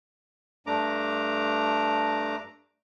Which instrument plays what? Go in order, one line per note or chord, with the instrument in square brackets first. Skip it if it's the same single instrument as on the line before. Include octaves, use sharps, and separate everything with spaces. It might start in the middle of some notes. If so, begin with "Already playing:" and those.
[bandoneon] G2 A3 D4 A#5 D6